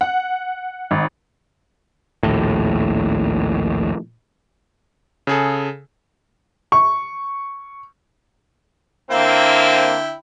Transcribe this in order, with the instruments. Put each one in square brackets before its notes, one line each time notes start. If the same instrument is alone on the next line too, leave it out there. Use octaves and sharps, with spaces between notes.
[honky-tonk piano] F#5
G#1
[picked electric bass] A#1 D#2 A2
[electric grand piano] C#3 G#4 A4
[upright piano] C#6
[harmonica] D3 E4 G5 [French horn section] A#3 C4